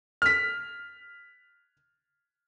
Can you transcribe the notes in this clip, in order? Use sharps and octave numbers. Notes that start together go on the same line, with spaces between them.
F6 B6